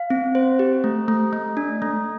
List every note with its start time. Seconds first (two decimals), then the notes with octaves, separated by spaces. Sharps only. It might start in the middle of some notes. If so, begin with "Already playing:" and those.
Already playing: F5
0.10 C4
0.35 C5
0.59 G4
0.84 A3
1.08 A3
1.33 A3
1.57 D4
1.82 A3